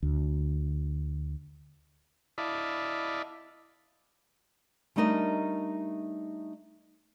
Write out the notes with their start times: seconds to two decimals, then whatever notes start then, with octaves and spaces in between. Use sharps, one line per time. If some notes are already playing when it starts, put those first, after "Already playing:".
0.03 D2
2.38 E4 D5 D#5 F5 A5 B5
4.96 G3 A3 D4 D#4 A#4 D#5